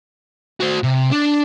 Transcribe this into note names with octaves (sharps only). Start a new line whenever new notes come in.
F#4 C5
C3
D4